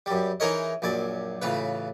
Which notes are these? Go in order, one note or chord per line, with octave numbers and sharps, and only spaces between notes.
F#2 G3
E3 D#4 G#4 A#4 C#5 D#5
A#1 F#2 D5 G#5
A1 C#3 F4 B4